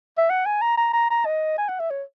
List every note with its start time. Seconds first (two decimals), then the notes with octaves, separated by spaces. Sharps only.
0.18 E5
0.30 F#5
0.46 G#5
0.62 A#5
0.77 A#5
0.93 A#5
1.10 A#5
1.26 D#5
1.58 G#5
1.69 F#5
1.80 E5
1.90 C#5